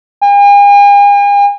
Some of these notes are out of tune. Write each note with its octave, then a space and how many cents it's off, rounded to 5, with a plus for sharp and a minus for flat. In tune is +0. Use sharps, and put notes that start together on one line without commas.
G#5 -45